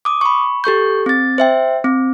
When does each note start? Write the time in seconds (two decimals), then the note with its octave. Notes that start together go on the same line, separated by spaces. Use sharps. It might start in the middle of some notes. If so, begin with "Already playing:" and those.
0.05 D6 D#6
0.21 B5 C#6
0.64 G4 A4 C#6 G6
1.06 C4 A6
1.38 C5 E5 G5
1.84 C4